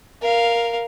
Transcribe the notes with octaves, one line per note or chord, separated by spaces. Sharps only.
A#4 F5